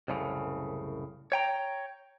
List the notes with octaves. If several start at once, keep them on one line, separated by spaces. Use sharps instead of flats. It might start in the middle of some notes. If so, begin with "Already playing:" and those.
C2 F#2 A2 C#3
C#5 G5 A#5